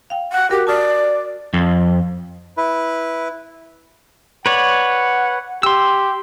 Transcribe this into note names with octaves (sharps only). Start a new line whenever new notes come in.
F5 G5
F#5
F#4 G4 A#4
D5 A5 D#6 F6
F2
E4 B4
B4 C#5 D5 F#5
G4 C6 E6